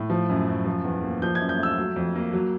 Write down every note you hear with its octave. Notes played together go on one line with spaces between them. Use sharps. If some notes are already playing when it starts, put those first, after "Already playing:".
Already playing: A2
F3
F#2
F#2
F3
E2
A#3
F3 G6
G#6
F#2
G6
A3 E6
F#3
F2
A#3
F#3